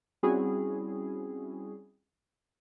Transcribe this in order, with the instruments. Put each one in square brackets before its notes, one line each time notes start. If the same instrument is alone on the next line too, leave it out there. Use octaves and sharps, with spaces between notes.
[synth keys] G3 C4 C#4 E4 F#4 G#4